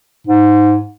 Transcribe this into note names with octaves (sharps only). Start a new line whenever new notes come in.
G#2